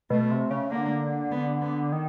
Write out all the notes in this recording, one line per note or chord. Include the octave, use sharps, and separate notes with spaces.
B2 A3
C3
C#3
D3 A#3
B3
B3
D#3